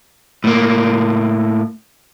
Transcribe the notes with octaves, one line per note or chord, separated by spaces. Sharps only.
A2 A#3